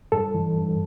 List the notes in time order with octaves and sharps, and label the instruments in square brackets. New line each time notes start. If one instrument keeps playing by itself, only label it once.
[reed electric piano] G2 A4
E3
G2